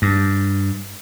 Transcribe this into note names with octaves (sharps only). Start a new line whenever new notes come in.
G2